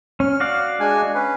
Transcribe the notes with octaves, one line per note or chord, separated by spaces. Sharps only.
C#4 F6
F#4 D5 F5
G#3 D4 G#5
C#4 B4